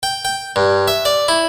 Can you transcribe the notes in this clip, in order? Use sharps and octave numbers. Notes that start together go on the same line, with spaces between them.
G5
G5
G2
E5
D5
E4